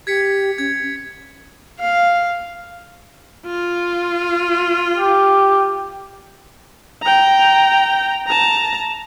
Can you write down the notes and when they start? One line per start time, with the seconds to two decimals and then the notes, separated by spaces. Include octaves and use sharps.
0.07 G4 G#6 B6 C#7
0.58 C#4 G#6
1.80 F5
3.46 F4
4.95 G4
7.02 G5 A#5
8.27 A5 A#5